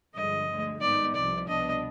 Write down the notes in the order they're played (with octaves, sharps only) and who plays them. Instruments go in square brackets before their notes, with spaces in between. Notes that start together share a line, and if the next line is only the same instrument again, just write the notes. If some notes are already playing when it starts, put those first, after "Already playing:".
[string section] G1 G2 D3 F3 G#3 [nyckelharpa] D#5
[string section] D2 D3 G#3
[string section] G#1 G#2 G3 B3 D#4 [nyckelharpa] D5
[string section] C2 C3 F3 [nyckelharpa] D5
[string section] C2 B2 B3 D4 [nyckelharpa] D#5